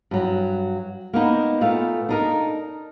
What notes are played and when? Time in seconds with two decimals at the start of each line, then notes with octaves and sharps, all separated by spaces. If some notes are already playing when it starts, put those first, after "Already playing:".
0.11 G2 F#3
1.13 A#3 B3 D#4
1.61 A#2 A3 B3 F5
2.09 D4 D#4 A#4